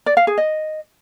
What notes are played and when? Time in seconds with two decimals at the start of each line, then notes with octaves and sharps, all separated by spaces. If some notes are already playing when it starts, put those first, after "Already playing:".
0.06 D5
0.17 F5
0.27 G#4
0.38 D#5